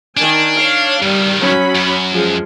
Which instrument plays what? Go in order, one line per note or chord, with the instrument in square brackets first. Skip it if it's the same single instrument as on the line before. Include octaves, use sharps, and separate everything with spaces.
[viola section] D#3 G#5 [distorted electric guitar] D4
[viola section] C#5 F5
[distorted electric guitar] G2 D#3 [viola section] G3
[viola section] F#3 C#4 B5
[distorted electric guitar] F#2
[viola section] F3 G#3